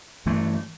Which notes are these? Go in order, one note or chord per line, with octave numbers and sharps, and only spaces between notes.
G2 E3 A3